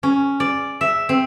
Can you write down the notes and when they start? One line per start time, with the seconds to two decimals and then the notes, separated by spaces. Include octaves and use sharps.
0.03 C#4
0.40 D5
0.81 E5
1.09 C4